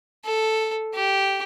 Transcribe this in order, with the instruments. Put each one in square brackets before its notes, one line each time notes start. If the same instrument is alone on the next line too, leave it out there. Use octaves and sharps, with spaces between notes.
[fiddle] A4
G4